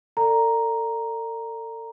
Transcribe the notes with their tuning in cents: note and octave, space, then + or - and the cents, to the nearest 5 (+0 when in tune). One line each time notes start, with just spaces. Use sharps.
A4 +40 D5 +0 A#5 +0